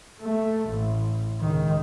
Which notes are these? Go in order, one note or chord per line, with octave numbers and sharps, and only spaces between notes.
A3
A1
C#2 D#3